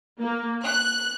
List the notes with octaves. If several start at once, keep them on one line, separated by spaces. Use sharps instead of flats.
A#3
F#6